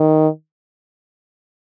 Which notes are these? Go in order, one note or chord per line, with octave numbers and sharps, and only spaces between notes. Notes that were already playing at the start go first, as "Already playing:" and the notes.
Already playing: D#3